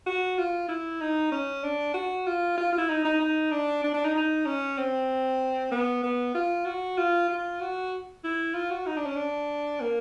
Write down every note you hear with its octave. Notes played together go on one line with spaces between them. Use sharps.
F#4
F4
E4
D#4
C#4
D4
F#4
F4
F4
F4
E4
D#4
D#4
D#4
D4
D4
D4
D#4
D#4
C#4
C4
B3
B3
F4
F#4
F4
F4
F#4
E4
F4
F#4
D#4
D4
C#4
D4
A#3